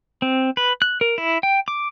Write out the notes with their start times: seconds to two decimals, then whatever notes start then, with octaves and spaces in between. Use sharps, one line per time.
0.22 C4
0.57 B4
0.82 F#6
1.01 A#4
1.18 E4
1.43 G5
1.68 D6